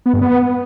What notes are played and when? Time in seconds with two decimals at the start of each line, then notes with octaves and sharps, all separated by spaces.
0.06 B3
0.14 G2
0.22 B3